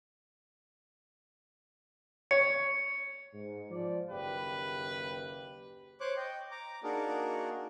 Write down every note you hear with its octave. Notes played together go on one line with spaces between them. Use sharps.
C#5 C#7
G#2
F3 D5
F#1 D#2 G4 B4
C5 C#5 D6 F#6
D#5 G5
A#5 D6
A#3 D4 D#4 F#4 G#4 A#4